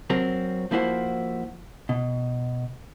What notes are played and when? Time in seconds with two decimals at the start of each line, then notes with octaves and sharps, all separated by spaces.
0.10 F#3 C4 A#4
0.71 F3 A#3 E4 F#4 C5
1.89 B2